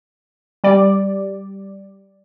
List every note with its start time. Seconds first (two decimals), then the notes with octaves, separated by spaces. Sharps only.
0.64 G3 D5